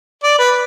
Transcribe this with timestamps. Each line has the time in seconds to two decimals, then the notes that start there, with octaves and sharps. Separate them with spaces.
0.23 D5
0.39 B4